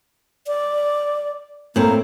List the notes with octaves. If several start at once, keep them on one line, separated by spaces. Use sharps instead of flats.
D5
A2 A#3 C4